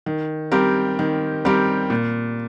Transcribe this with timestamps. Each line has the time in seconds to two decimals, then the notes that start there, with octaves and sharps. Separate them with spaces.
0.06 D#3
0.52 G3 C4 G4 A#4
0.99 D#3
1.45 G3 C4 G4 A#4
1.90 A#2